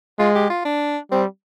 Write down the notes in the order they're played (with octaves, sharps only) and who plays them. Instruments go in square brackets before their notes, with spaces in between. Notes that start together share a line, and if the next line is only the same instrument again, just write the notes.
[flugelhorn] G#3 [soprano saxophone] F4
[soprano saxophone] G4
F4
D4
[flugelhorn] G3 [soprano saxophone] C4